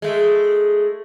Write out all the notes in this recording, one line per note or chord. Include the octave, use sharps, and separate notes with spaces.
G#3 A3